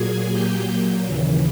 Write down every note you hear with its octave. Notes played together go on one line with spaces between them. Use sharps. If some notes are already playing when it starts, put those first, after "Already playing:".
Already playing: A#2 F#3 A#3 G#4 G#5
G4 G5
D#2 C#3 E3